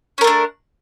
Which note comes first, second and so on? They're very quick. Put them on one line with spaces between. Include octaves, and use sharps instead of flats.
C#4 A#4 A3 D4